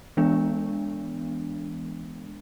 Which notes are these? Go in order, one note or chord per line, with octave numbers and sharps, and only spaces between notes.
E3 G#3 B3 D4